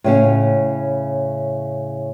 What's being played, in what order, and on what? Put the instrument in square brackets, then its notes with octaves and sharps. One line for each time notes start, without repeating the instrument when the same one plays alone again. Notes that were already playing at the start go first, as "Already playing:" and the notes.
[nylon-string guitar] A2 C#3 C#4